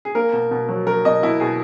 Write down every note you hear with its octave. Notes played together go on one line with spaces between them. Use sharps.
G#4
A#3 A#4
B2
B2
F#3
F#3 A#4
B2 D#5
B2 E4
B2 G#4